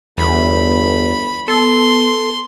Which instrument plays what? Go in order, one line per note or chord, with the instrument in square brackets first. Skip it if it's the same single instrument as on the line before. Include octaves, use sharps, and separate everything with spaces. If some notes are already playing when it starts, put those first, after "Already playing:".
[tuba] G1 [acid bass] E2 [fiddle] B5
[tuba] B3 [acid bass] A4 [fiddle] C6